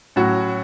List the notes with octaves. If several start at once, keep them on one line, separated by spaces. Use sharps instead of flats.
A2 F#3 C#4 F#4